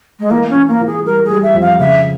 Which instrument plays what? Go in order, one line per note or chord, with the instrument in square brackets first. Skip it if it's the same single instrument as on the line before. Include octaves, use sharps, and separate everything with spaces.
[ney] G#3
[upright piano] E3 [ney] A#3
[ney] C#4
[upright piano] E3
[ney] A#3
[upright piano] E3
[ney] G#4
[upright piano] G3 [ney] A#4
[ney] G#4
[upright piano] G3
[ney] E5
[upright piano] F2
[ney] F5
[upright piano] C#3 [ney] E5